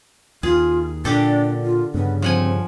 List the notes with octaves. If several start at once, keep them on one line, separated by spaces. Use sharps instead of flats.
D#2 F4 G#4
A#2 D3 D4 G4 A4
F4
G2 C#3 B3
F3 C4 F#5 G#5